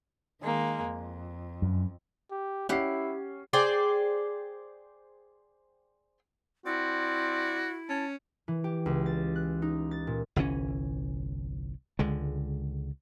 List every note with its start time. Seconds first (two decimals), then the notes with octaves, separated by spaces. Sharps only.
0.41 D#3 G#3 A#3
0.85 F2
1.62 F#2
2.31 G4
2.69 C#4 E4 G4 F#5 C7
3.53 G#4 C5 D5 G5
6.66 C4 E4 F#4 D5
7.89 C#4 A5
8.48 E3
8.64 G4
8.86 C#2
9.06 A6
9.36 F#6
9.62 D#4
9.91 A6
10.07 A#2
10.36 G1 C2 E3 C#4
11.99 C#2 D3 G#3